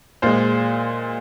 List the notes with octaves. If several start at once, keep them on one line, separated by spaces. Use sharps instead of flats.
A#2 G#3 C5